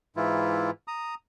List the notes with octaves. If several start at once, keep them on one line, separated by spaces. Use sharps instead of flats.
G#2 E3 E4 F4
A#5 D#6